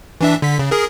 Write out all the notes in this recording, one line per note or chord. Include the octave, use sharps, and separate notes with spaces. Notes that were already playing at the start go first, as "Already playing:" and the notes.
E3 D4 E5
D3 B6
C#3
G#4 A#4